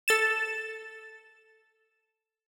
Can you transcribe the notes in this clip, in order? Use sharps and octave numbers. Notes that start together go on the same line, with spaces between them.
A4 A6 E7